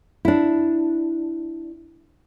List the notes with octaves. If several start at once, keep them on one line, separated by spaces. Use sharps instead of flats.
D4 E4